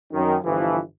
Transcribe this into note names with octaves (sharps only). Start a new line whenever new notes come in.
F#2 D#3
G1 E3 F3